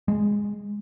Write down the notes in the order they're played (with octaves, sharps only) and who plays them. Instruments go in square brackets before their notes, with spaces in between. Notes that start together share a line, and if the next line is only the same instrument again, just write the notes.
[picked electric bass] G#3